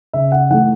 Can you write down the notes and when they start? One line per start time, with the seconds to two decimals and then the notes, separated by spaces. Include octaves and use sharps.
0.13 C#3 E5
0.32 F#5
0.50 E3 A3 F#5